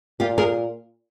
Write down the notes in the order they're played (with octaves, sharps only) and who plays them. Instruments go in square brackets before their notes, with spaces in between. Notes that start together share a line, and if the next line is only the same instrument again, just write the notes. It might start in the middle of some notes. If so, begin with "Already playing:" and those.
[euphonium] A#2 [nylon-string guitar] F4 G4
[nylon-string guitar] G#4 A#4